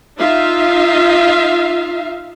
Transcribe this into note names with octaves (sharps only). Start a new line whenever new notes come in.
D#4 F4 E5 F5